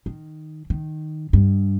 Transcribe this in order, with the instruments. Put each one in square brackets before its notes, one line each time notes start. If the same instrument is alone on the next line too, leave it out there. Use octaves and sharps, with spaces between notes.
[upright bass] D#3
D#3
G2